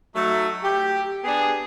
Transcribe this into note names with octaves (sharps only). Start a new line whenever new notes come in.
F#3 A3 D#4
G4
B3 D4 G#4